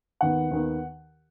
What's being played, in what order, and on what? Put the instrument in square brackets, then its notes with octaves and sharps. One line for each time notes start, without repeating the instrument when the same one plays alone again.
[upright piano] D#2 D#3 B3 F#5
D#2 D#3 B3